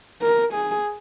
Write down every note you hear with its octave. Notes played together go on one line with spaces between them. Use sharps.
A#4
G#4